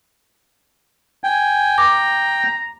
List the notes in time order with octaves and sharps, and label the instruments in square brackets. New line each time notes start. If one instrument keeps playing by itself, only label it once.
[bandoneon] G5 [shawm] G#5
[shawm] A#5 [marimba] D6